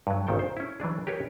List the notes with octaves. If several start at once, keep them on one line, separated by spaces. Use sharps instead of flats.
G2 F#3
G#1 A#2 D#3 A4 G5
C5
C#4 E4
E3 F#3 D4 G#4
G4 G#4 A#4 B4 C#5